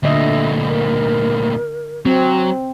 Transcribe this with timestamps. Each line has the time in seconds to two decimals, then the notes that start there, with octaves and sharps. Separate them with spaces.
0.03 D2 A#2 D3 D#5 E5
0.68 A#4
2.05 F#3 C4